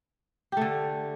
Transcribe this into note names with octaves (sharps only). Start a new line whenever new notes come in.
D3 A3 G4